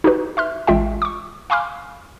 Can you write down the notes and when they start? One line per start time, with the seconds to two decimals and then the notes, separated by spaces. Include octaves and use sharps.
0.04 D#4 F#4 G4 B4
0.37 E5 C6 F6
0.67 A1 G#3 F4 E5 G5
1.02 C#6 D6
1.50 F5 G#5 B5 C6 D6 F6